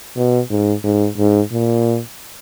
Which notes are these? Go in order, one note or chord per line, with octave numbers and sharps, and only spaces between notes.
B2
G#2
G#2
G#2
A#2